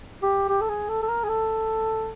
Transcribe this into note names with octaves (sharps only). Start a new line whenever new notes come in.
G4
G4
A4
G#4
A4
A4
A#4
G#4
A4